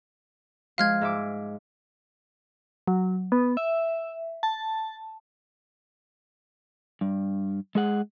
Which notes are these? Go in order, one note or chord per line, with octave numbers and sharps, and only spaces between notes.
F3 G#3 F4 F5 F6 G#6
G#2 E5 D6
F#3
B3
E5
A5
G2
G#3 G#4 F#5